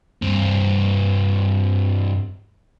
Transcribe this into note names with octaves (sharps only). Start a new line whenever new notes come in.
G2 C4